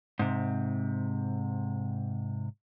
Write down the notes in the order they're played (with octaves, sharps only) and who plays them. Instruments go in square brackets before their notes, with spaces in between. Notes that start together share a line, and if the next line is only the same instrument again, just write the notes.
[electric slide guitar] G#2 C3